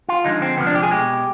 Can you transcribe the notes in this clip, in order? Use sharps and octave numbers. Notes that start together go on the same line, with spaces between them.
F4
D3 F3 G#3 D#4
C4
C3 F3 G#3 B3
D4
G4
G#4
B2 G#3 G4